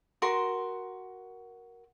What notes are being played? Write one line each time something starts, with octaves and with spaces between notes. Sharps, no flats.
F#4 A#4 C6